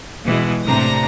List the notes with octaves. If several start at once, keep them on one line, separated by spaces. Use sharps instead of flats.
B2 E3 G#3
A2 C3 D4 A#5 A#6